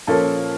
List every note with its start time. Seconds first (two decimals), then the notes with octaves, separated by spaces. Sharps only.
0.07 A#2 F3 A#3 C#4 A4